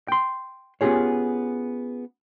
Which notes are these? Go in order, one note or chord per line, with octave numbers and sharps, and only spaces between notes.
G5 C6
B3 C#4 F4 G4 G#4 C#5